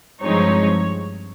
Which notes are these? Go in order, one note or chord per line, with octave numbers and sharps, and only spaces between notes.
G2 F3 G#3 C4 D#4 C#5